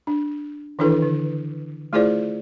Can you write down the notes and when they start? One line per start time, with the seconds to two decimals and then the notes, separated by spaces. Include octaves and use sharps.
0.07 D4
0.79 D#3 E3 D4 E4 A4 B4
1.02 D3
1.93 A3 E4 F4 G#4 C5 D5